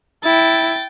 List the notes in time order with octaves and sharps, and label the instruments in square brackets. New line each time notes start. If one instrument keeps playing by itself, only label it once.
[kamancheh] E4 [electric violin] G5 A6